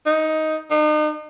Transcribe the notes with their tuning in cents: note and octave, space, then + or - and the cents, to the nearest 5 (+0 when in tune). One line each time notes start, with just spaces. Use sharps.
D#4 +10
D#4 -40